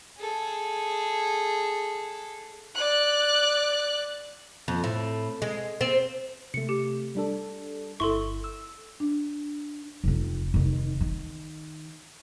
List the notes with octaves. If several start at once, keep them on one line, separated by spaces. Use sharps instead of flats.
G#4 A4
D5 F#6
F2
A2
G#3
C4
C3 A3 C#7
G4
G3 D4 A4
G1 E4 A4 C6 C#6
E6
D4
F1 F2
F1 D#3
D#3